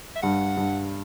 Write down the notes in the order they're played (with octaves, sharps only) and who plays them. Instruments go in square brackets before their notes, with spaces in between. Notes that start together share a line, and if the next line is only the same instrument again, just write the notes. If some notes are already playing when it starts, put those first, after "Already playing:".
[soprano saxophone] E5
[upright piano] G2 [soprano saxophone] F#5
[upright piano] G2